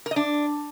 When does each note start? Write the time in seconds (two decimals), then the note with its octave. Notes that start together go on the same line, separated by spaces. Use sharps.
0.06 A#4
0.11 D#5
0.16 D4